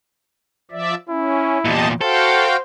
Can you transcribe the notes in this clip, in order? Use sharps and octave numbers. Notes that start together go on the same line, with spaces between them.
F3 D5 E5
C#4 E4
E2 A#2 G4 D#5 A5
F#4 A4 C5 F5 G5